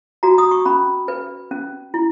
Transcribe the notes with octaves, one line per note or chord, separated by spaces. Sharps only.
F#4 A#5
D#6
C#6
C#4 B5
B4
C#4
E4